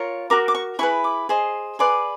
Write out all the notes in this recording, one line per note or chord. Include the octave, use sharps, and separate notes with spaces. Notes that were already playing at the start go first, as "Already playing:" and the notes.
Already playing: F4 A#4 C#5
F#4 A#4 D6
D6
C#6
E4 G#4 B4 C#6
D6
G#4 C5 D#5
G#4 B4 D5 C6